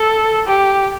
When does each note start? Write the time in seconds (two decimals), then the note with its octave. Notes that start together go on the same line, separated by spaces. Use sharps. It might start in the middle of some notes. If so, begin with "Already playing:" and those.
Already playing: A4
0.47 G4